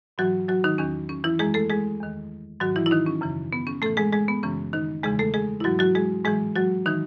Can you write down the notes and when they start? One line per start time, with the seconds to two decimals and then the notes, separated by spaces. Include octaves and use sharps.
0.18 G#2 E3 F#3 F#4
0.49 F#3 F#4
0.64 D#3 D#4
0.78 E2 D#3 C#4
1.09 C#4
1.24 E3 E4
1.39 F#2 E3 G#3 G#4
1.54 A3 A4
1.70 G#3 G#4
2.00 E2 D#3
2.60 G#2 D#3 F#3 F#4
2.76 E3 E4
2.86 E4
2.91 D#3 D#4
3.06 C#4
3.21 F#2 C#3 E3
3.53 B3
3.67 C#4
3.82 A2 E3 A3 A4
3.97 G#3 G#4
4.12 G#3 G#4
4.28 B3
4.43 F#2 C#3 E3 C#4
4.73 D#3 D#4
5.03 E2 C#3 E3 G#3 G#4
5.19 A3 A4
5.34 G#3 G#4
5.60 E4
5.64 G#2 E3 F#3 F#4
5.79 F#3 F#4
5.95 G#3 G#4
6.24 A2 E3 G#3 G#4
6.56 F#3 F#4
6.86 D#3 E3 D#4